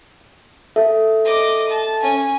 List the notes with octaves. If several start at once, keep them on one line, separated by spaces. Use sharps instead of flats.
A4 E5
D#5 D6
A5
C#4 G#5